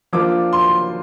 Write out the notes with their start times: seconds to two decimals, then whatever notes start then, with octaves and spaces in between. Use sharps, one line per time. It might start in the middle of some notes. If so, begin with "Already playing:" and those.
0.13 F3 A#3 D4 F4 D6
0.53 C6